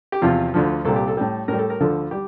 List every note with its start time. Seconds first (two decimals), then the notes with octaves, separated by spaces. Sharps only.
0.12 G4
0.22 E2 C3 F3 F4
0.54 D2 D3 F3
0.85 C2 A#2 G3 A4
0.96 G4
1.08 A4
1.17 A2 G3
1.48 A2 G3 A#4
1.58 A4
1.70 A#4
1.80 D2 D3 F3 A4
2.11 G3 G4